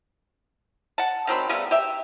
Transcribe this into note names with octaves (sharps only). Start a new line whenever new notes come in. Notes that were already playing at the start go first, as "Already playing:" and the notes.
F#5 A5
D#3 F#3 C4 B5
C#3 G3 A3 B3
G4 E5